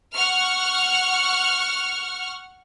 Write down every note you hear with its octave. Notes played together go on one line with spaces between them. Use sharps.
F#5 C#6 F6